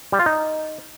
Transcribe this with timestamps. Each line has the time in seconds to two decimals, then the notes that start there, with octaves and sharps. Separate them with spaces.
0.12 G3
0.19 F4
0.26 D#4